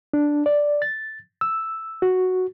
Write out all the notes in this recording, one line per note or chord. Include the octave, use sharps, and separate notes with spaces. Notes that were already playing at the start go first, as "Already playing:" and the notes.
D4
D5
A6
E6
F#4